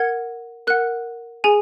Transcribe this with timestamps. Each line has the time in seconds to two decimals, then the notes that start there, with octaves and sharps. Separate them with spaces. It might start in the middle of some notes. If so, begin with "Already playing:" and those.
Already playing: A#4 F#5 G#6
0.67 A#4 F#5 F#6
1.44 G#4 G#5